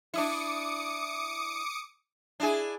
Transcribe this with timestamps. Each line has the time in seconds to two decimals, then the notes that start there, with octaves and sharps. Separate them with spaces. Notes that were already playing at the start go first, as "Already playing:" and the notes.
0.14 D4 E4 D6 D#6 C#7
2.40 D4 E4 G#4